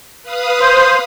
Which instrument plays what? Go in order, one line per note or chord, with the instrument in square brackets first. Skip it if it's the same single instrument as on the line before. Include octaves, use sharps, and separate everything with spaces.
[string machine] B4 F5 D#6
[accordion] C5